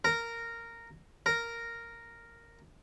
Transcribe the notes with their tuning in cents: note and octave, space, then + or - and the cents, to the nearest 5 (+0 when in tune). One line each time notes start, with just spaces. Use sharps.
A#4 -10
A#4 -5